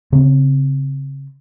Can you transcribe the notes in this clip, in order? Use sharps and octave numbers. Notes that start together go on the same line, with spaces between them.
C#3 C4